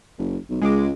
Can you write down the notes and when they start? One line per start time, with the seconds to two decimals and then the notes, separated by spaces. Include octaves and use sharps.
0.19 F#1
0.49 B1
0.62 C#2 G#3 D6